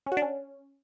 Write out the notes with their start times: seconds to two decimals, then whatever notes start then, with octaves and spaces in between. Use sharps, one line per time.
0.06 C#4
0.12 F#4
0.17 D4
0.22 C#4